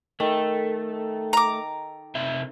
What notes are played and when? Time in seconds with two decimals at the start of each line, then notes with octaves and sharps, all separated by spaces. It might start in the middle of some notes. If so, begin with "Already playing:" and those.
0.20 D#3 A3 A4
1.33 A#5 D6
2.15 C3 D#4 E5